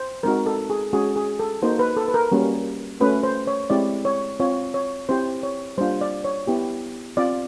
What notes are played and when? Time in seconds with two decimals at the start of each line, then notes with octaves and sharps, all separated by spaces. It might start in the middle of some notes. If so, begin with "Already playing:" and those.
Already playing: C5
0.23 G#3 C4 D#4 F#4 A#4
0.46 A4
0.70 G#4
0.93 G#3 C#4 F#4 G#4
1.16 G#4
1.40 A4
1.62 A#3 D#4 F#4 C5
1.79 B4
1.97 A4
2.08 B4
2.14 A#4
2.32 G3 A#3 C#4 F#4
3.00 A3 C#4 F#4 B4
3.23 C5
3.47 C#5
3.70 G#3 C4 E4 G4 D5
4.05 C#5
4.40 C4 F4 C#5
4.74 C#5
5.09 C4 E4 G4 C5
5.43 C#5
5.78 G3 A#3 D4 F4 C5
6.01 D5
6.25 C#5
6.47 B3 E4 G4
7.17 C4 F4 D5